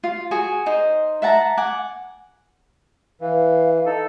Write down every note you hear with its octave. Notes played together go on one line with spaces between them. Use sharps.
F4
F#4 G#4 G#5
D#4 C5
E5 F#5 A5 A#5
F#5 G#5 D6
E3 F5
D#4 A4